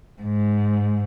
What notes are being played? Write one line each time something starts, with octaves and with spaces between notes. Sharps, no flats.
G#2